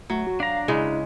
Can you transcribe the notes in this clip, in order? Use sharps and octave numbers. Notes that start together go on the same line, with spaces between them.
F#3 A3
F#4
D4 F5 A#5
C#3 G#3 E4